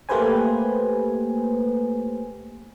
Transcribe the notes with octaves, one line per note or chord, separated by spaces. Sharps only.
A3 A#3 G4 B4 C5 G#5